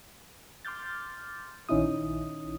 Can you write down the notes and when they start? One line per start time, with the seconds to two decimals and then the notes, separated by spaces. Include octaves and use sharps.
0.65 C6 D6 F6 G6 A6
1.69 A#1 D#3 C#4 D#4 E4 D#6